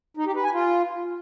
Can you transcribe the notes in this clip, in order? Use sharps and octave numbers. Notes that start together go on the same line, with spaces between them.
D#4
G4
B4
G#5
F4